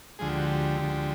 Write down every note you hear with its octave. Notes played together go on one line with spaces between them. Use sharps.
D2 D3 F3 G#3 G#4
G4
F#4
G4
D2 D3 F3 G#3